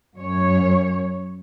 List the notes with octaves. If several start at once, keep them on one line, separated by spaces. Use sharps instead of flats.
F#2 C#5